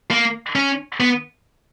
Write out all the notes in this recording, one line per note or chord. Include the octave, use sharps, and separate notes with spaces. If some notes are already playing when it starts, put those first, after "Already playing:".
A#3
C#4
B3